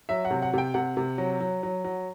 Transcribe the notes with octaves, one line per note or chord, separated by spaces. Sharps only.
F#3 E5
F#5
C3
F#5
C3 G5
C3 F#5
C3
F#3
F#3
F#3
F#3